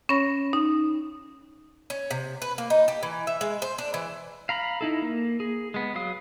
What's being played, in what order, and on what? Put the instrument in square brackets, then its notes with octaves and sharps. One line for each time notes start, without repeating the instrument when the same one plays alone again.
[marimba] C#4 C#5 B5 A#6
D#4
[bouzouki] C#4
C3
B4
A#3
D#4
G4
E3
E5
G#3
C5
D4
E3
[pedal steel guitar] F5 A#5 B5
D#4 E4 A4
A#3
G#4
G#3 B3
F#3 F5 D#6